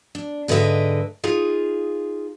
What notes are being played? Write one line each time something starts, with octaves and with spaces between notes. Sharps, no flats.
D4
G#2 D3 B4 D#5 E5 G5
D#4 F4 G#4